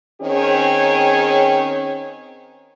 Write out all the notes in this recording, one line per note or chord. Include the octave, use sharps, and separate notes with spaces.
D#3 C4 C#4 G#4 C#5